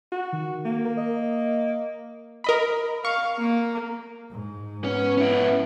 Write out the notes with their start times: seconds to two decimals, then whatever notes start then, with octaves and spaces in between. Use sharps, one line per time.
0.12 F#4
0.33 D#3
0.65 A#3
0.85 A#4
0.97 D#5
2.44 A#4 D#5 B5
3.05 F5 C#6
3.37 A#3
4.31 G#2
4.84 B3 C#4
5.18 C#4 E4